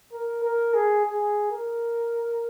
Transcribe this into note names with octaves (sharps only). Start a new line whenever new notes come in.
A#4
A#4
G#4
G#4
A#4